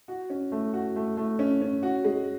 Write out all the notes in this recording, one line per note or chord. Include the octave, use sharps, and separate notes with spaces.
F#4
C#4
A3
F#4
A3
A3
C#4
C#4
F#4
G#3